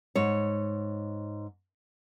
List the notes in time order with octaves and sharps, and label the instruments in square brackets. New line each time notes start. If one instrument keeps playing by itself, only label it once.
[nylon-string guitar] G#2 C#5